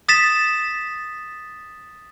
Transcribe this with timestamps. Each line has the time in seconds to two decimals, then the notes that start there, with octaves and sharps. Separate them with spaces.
0.09 D#6 A6 B6 E7